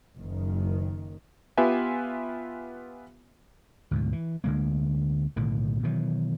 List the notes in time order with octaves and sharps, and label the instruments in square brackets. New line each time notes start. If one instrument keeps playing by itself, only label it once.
[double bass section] F#1 D#3
[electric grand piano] B3 F4 G4 B4 E5 G#5
[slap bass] D2 G#2 B2
E3
D2 D3 G#3 A#3
B1 A2 D3 D#3
B2 D#3 E3 F#3